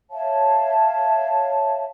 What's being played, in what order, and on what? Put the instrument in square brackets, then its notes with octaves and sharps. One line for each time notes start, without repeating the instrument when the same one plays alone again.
[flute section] C#5 E5 F5 A5